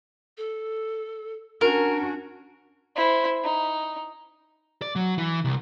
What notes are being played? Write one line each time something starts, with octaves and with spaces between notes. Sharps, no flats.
A4
C#4 D4 F#4 A#4
E4 C5
D#4
D5
F#3
E3
C2